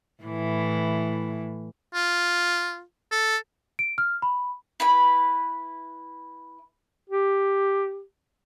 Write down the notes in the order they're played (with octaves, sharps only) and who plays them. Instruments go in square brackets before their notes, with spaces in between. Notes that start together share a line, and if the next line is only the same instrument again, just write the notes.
[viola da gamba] A2 E3
[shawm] F4
A4
[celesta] D7
F6
B5
[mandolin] E4 B4 B5
[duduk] G4